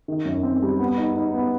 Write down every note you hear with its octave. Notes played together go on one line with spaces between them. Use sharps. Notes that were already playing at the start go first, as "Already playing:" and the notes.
D#3
F#2
C4
G3
B3
D#4
D#4
B3